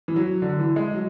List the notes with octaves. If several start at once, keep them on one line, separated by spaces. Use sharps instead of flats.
E3
F#3
D3
E3
G#3
F#3